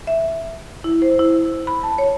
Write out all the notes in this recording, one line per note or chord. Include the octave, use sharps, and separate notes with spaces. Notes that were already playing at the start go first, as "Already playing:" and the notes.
E5
E4
C5
E4
B5
A5
C#5